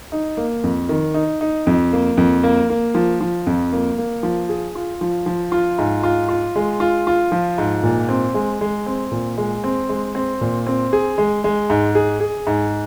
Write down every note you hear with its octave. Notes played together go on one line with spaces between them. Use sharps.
D#4
A#3
F2
D#3
D#4
D#4
F2
A#3
F2
A#3
A#3
F3
F3
F2
A#3
A#3
F3
G#4
F4
F3
F3
F4
G#2
F4
F4
G#3
F4
F4
F3
G#2
A#2
C4
G#3
G#3
C4
A#2
G#3
C4
G#3
C4
A#2
C4
G#4
G#3
G#3
G#2
G#4
G#4
G#2